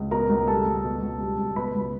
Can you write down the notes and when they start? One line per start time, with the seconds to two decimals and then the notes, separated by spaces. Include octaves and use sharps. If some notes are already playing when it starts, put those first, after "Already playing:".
Already playing: C#2
0.11 B2 A#4 A#5
0.29 C#2
0.47 G3 A4 A5
0.66 C#2
0.84 B2
1.02 C#2
1.20 G3
1.39 C#2
1.56 B2 B4 B5
1.74 C#2